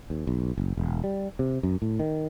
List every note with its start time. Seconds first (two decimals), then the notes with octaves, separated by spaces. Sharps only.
0.10 D#2
0.27 B1
0.58 F#1
0.77 E1
1.04 G3
1.39 C3
1.63 F#2
1.82 A2
2.00 D#3